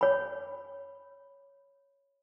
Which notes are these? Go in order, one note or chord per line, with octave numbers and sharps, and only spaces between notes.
C#5 B5